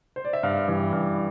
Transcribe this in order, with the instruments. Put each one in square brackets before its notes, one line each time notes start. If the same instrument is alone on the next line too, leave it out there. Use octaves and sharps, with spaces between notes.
[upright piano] C5
D5
E5
G2 F5
E3 G3
G2